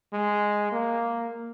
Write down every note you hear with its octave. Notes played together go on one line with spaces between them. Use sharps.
G#3
A#3